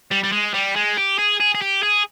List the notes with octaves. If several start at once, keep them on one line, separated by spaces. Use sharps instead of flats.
G3
G3
G#3
G3
G#3
G4
G#4
G#4
G#4
G4
G#4